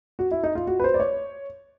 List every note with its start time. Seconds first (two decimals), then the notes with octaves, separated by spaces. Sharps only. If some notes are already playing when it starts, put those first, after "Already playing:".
0.19 F#4
0.31 E4
0.43 D#4
0.55 F4
0.67 F#4
0.80 B4
0.84 C5
0.94 D5
1.00 C#5